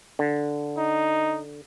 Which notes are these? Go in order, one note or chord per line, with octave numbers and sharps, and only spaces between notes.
D3
D#4